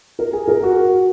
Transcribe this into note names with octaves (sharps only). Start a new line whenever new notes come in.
A#4
G#4
A#4
F#4